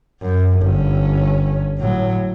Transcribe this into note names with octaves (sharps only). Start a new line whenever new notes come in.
F#2
G1 C#4
A2 F#3